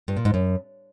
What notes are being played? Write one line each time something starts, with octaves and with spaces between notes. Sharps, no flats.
G2
A#2
G#2
F#2